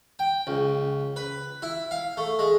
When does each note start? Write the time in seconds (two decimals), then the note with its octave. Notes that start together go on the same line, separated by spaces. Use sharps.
0.19 G5
0.47 C#2
1.16 B4
1.62 E4
1.91 F5
2.17 A3
2.39 G#3